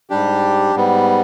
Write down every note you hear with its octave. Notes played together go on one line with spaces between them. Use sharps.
G#2 G3 D4 G4
G#2 G3 B3